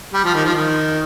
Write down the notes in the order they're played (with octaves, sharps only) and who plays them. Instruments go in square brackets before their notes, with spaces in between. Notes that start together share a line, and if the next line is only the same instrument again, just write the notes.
[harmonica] G3
F3
D#3
F3
D#3